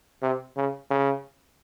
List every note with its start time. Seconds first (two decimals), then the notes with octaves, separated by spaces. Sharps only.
0.22 C3
0.57 C#3
0.90 C#3